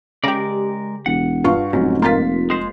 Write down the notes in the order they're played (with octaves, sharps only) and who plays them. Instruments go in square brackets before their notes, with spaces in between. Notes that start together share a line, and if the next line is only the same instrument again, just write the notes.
[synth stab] C#3 G4 [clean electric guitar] G#3 A#4 D5
[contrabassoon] E1 [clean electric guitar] F#5
[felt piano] G2 F5 C#6 [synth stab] F4
[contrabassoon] F1 [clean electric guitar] G#2 [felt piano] F#3 C#4
[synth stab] A#3 F4 [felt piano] C6 A6 B6
[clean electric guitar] G#3 C5